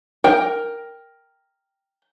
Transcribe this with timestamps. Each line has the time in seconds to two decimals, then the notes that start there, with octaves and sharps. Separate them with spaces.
0.24 A#4 G5